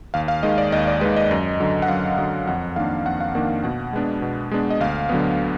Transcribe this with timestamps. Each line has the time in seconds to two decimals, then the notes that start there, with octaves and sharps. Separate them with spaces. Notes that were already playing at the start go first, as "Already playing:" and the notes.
0.14 D#2 F5
0.28 F5
0.43 D#3 G#3 D#5
0.58 D5
0.72 D#2 D#5
0.87 D5
1.01 G#3 B4
1.06 D#3
1.16 D#5
1.31 F#2
1.60 D3 F#3
1.82 F#5
1.88 F#2 F5
2.18 D3 F#3 D#5
2.47 F2 F#5
2.76 D#3 A#3 D4 F5
3.05 F2 F#5
3.21 F5
3.35 D#3 A#3 D4
3.64 B2 F#5
3.93 G#3 B3 D4
4.22 B2
4.51 G#3 B3 D4
4.70 D#5
4.80 D2 F5
5.09 D3 F#3 B3